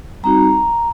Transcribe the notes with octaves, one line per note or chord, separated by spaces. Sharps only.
G3 C4 D#4 F#4 A#5